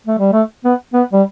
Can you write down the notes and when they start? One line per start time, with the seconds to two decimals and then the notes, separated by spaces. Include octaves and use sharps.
0.07 A3
0.19 G3
0.32 A3
0.65 B3
0.94 B3
1.13 G3